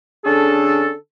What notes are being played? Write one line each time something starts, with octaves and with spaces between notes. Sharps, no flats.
D3 C#4 D4 G#4 A4